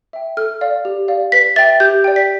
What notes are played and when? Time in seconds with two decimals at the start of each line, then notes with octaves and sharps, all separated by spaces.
0.13 E5 G5
0.37 A4 F6
0.61 D5 F5
0.85 G4
1.08 D5 F5
1.32 B4 B6
1.56 E5 G5 A6
1.80 G4 G6
2.04 D5 G5
2.16 B6